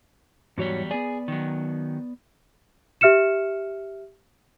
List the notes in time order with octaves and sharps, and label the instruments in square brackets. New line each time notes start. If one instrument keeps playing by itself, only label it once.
[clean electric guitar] E2 F#3 G3 [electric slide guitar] G#2 F#4 C#5
[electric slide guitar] B3 D5 [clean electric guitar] G#4
[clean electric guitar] D#3 F#3
[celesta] G4 E5 F6 C#7 E7